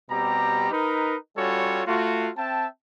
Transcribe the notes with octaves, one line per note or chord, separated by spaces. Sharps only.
B2 G3 C4 G4 A#5
D#4 A#4 B4
G3 C#4 F4 F#4 A4 C#5
A3 F4 F#4
C4 E5 G5 A5